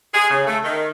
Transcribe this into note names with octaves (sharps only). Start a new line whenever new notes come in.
G#4
C#3
A3
D#3